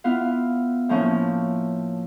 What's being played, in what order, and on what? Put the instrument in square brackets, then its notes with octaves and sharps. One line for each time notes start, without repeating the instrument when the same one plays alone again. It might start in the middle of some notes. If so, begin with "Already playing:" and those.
[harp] B3 E4 F4 F5
A2 F3 A#3 C#4 E4